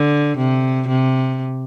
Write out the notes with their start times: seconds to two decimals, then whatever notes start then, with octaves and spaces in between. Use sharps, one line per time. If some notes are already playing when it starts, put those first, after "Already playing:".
Already playing: D3
0.37 C3
0.88 C3